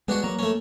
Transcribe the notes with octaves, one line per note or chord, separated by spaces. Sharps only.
G#3 B3 D4 F#4
F#3 A#3
A3 C#4